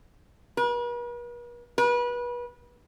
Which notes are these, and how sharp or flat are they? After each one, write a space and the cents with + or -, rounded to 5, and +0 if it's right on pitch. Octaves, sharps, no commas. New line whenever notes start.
B4 -45
B4 -30